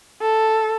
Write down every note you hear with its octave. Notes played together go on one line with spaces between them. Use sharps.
A4